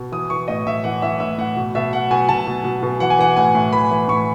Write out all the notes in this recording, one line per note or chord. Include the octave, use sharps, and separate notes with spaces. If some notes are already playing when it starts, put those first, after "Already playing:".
Already playing: B2
E3 D#6
E3 C#6
A2 D#5
A2 E5
E3 F#5
E3 E5
A2 E5
A2 F#5
B2
B2 E5
B2 F#5
B2 G#5
B2 A5
B2
B2
B2
E3 F#5
G#5
E3 F#5
A2 G#5
A2
E3 B5
E3
A2 C#6